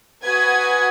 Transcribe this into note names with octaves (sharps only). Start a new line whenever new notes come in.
F#4 B4 G#5 D#6 G#6